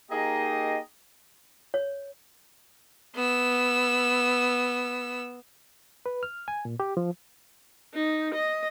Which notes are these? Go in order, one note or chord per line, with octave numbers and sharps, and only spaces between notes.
A#3 D#4 G4 G#4 D#5
C#5
B3 E6
B4
F6
G#5
A#2
G4
F3
D#4
D#5